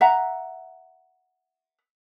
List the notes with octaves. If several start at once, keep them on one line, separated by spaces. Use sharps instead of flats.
E5 F#5 A#5